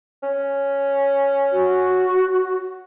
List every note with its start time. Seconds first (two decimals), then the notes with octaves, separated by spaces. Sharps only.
0.23 C#4
1.53 F#4